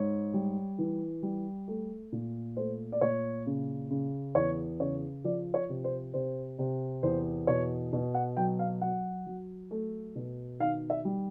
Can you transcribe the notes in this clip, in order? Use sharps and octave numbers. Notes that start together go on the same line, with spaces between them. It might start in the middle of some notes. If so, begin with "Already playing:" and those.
Already playing: G#2 C#5
G3
E3
G3
A3
A#2
A3 C5
D5
A#2 C#5
C#3
C#3
E2 C#5
C#3 C#5
F3 D5
C#5
C3
C5
C3 C5
C3
E2 C5
B2 C#5
B2
F#5
F#3 G5
F5
F#3 F#5
F#3
A3
B2
D#3 F5
E5
G3